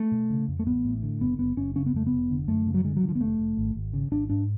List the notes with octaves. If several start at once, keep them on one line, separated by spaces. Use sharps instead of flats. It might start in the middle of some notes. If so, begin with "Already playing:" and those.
Already playing: A3
B2
C#3
F2
A3
A1 B3
A2
D3
F#1 B3
F#1 B3
F#1 C#4
C#3 C#4
B3
F2 A3
B3
F1
D3
F#2 A3
C#3
F#3
D3 G#3
F#3
D3
F3
B3
F1 A3
F1
G#1
G#1
C#3
G#1 D4
G#2 D4